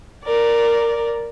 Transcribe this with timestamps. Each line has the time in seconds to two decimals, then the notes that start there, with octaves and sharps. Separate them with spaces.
0.24 A#4 D5